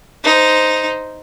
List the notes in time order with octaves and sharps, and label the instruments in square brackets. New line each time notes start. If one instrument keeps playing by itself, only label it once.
[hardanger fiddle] D#4 C5